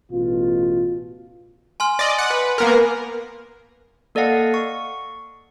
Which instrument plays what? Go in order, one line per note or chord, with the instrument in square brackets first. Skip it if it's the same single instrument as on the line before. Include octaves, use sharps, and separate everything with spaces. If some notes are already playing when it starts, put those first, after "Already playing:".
[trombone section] A1 B2 F4
[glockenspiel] G#5 C6 F6
[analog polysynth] D5 D#5
F#5
B4
A#3 B3 A#4
[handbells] A#3 A4 D5 D#5 F5 F#5
C#6